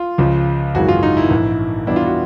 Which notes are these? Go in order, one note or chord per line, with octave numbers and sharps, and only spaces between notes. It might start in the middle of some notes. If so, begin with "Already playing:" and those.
Already playing: F4
C#2 C#3 F3
G#1 F#2 C#3 E3 G#3 F#4
F4
D#4
E4
A#1 G#2 E3
E2 B2 G3 B3 D4 E4
F4
F#4